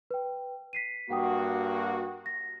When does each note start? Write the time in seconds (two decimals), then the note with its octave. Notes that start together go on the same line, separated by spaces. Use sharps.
0.11 B4 G5
0.73 B6 C7 D#7
1.10 G2 A#3 F#4 F#5 G5 D#6
2.26 A#6